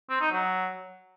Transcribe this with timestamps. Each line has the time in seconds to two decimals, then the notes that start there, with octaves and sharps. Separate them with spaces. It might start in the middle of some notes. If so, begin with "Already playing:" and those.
0.10 C4
0.21 D#4
0.32 F#3